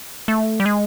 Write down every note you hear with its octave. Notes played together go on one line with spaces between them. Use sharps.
A3
G3
G#3